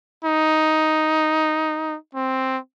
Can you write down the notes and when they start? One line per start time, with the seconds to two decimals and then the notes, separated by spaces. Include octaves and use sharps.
0.25 D#4
2.15 C4